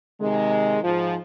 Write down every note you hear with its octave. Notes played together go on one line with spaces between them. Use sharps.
C3 D#3 G#3
G#2 F3